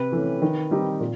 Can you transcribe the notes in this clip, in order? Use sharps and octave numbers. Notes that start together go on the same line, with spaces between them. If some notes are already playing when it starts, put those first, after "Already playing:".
Already playing: C3 B4
E3 A3 C#4
D#3
G3 C4 D#4 G4
A#2